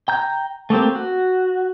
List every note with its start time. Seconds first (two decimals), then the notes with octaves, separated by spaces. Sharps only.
0.08 G5 A#5 G6
0.70 A3 A#3 C4 G4
0.95 F#4